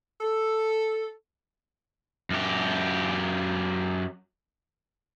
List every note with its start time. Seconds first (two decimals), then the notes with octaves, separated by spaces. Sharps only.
0.21 A4
2.30 F#2 G4